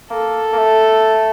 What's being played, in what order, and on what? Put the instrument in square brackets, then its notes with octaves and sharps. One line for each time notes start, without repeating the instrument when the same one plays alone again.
[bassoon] A#3 [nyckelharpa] A4
[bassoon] A#3
A3